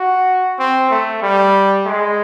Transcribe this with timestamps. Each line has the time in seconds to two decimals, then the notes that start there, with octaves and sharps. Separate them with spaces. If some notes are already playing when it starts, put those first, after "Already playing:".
Already playing: F#4
0.59 C4
0.90 A3
1.22 G3
1.86 G#3